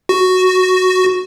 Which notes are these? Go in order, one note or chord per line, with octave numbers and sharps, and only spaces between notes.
F#4